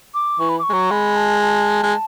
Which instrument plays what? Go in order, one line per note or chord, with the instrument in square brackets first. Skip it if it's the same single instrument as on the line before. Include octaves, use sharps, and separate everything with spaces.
[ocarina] D6
[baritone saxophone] E3 [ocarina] C#6
[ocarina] B5
D6
C#6
[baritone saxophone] G#3
F#3
[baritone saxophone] G#3 [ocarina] B5
[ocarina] A5
A5
[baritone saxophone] G#3